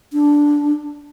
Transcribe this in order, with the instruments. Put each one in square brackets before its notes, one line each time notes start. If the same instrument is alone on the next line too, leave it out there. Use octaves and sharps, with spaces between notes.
[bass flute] D4